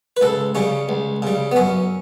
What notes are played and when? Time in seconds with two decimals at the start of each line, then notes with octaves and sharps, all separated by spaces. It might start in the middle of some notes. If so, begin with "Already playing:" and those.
0.17 B4
0.21 C#2 A4
0.55 C#3 G3 C#4
0.89 C#2
1.22 C#3 G3
1.52 B3
1.56 F#2 C#4